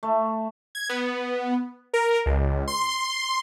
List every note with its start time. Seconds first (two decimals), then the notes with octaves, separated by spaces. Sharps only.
0.03 A3
0.75 G#6
0.89 B3
1.94 A#4
2.26 C#2
2.68 C6